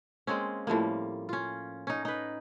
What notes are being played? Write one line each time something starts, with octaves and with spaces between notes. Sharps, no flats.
G#3 A#3 C4 C#4
A2 F3 G3 A#3
C#4 F4
C#4 D#4
D#4 B4